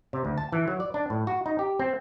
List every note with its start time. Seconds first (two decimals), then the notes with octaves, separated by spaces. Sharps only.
0.13 C3
0.25 D2
0.38 A5
0.52 E3
0.68 F#3
0.80 D5
0.94 D4
1.10 A2
1.27 F#4
1.46 D#4
1.59 G4
1.79 C4